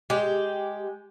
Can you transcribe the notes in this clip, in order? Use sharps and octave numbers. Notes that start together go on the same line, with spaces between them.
G#3 G4